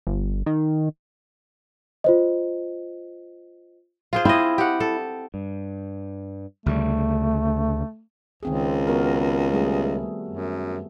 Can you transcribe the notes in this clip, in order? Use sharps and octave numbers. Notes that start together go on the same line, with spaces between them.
G1
D#3
F4 C5 D#5
F4 G#4 C5
C4 E4 D#5
G4 F#5
A4
G2
D2 C#3 G3 A3
C#2 D#3 C4 G#4
B3 F#4 A#4
G3 A3 G#4
F#2